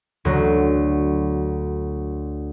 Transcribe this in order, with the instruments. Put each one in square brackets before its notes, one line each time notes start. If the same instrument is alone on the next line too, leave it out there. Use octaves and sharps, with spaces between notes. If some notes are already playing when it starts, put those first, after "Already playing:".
[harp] D2 F#3